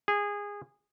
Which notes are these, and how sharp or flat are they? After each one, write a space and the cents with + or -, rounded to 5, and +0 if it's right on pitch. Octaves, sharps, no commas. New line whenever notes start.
G#4 -20